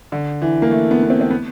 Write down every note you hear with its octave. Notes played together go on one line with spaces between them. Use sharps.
D3
E3
A#3
A3
B3
B3
C4
C4
B3